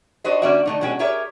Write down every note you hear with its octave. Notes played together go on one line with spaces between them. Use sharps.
D4 D#4 F#4 A4 C5 D#5
D3 A#3 C#4 F#4 D5 E5
D3 A3 D#4
B2 G#3 C#4 F#4 G5
G4 G#4 A#4 C#5 E5